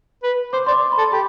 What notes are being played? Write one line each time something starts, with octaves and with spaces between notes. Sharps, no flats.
B4
C5 D6
D5 C6
D6
B5
A4
G4 B5